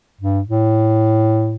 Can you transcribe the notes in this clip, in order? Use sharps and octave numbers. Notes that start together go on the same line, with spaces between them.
G2
A2